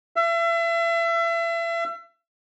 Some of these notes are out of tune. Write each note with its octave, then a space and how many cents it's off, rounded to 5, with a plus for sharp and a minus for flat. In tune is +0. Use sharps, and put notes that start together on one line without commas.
E5 +35